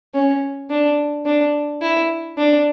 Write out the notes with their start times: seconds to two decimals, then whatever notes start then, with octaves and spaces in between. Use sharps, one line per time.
0.14 C#4
0.70 D4
1.26 D4
1.82 E4
2.38 D4